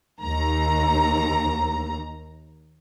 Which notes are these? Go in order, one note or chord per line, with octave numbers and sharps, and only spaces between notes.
D#2 A#5